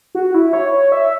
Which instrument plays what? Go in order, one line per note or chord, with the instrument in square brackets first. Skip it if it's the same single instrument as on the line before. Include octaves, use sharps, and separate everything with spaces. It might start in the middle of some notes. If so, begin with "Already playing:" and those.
[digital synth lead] F#4
E4
C#5
C#5
E5